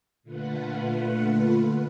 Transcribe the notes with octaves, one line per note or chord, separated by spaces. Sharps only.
A#2 D3 A3 F4 B4 F#5